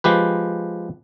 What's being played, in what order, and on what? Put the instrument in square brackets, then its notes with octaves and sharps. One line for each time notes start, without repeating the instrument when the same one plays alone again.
[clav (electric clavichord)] F3 G#3 G4 B4